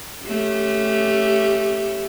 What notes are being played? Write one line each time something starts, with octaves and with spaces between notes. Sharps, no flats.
A3 C#4 G4